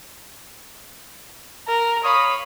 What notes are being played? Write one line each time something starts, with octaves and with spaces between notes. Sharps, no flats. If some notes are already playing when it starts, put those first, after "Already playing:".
A#4
C#5 F5 B5 D#6